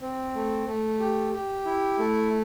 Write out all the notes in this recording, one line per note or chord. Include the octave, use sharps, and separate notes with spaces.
C4
A3
A3
G4
G4
E4
A3